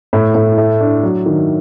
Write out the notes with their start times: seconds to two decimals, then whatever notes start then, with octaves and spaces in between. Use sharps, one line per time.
0.13 A2
0.35 A2
0.58 A3
0.81 D4
1.03 F#3
1.26 D#3